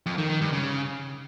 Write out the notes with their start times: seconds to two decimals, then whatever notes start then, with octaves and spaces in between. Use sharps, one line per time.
0.06 F2
0.18 D#3
0.29 D#3
0.41 G2
0.53 C#3